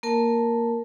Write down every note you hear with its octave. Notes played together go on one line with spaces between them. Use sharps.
A#3 A#4 A5